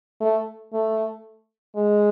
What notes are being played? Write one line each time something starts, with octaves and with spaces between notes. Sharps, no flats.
A3
A3
G#3